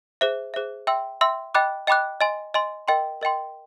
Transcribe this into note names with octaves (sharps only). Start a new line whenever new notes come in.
G#4 C5 E5
G#4 C5 E5
E5 G5 C6 E6
E5 G5 C6 E6
D#5 G5 B5 D6 F#6
D#5 G5 B5 D6 F#6
D#5 G#5 C6
D#5 G#5 C6
A#4 D#5 G5 C6
A#4 D#5 G5 C6